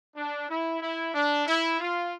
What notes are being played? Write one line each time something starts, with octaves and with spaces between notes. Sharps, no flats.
D4
E4
E4
D4
E4
F4